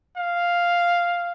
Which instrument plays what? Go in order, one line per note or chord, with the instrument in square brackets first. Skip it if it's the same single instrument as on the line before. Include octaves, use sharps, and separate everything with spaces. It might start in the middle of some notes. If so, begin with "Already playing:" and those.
[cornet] F5